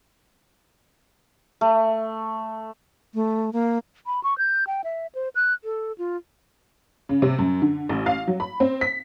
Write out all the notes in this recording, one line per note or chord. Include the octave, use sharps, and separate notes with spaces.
A3
A3
A#3
B5
C#6
G6
G5
E5
C5
F#6
A4
F4
C#3
C3
F#2
D3
A1
F5
F#3
B5
C4
B6